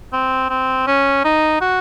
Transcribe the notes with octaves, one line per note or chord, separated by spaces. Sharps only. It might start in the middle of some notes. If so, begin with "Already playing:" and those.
C4
C4
C#4
D#4
F#4